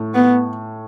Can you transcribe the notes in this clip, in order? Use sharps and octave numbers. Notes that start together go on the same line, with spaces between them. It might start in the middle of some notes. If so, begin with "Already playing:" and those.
Already playing: A2
B3